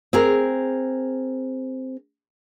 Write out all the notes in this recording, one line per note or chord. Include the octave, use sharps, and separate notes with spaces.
C4 G#4 A#4